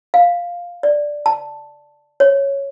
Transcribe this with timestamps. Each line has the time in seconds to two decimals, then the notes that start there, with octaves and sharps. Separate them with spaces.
0.14 F5
0.83 D5
1.26 A5
2.20 C#5